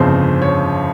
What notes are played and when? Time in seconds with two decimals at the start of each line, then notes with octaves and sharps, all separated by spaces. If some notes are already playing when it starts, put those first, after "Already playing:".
Already playing: G1 F2 C#3 C5
0.42 C#5